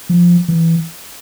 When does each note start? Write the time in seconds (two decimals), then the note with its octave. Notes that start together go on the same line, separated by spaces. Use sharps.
0.09 F3
0.48 E3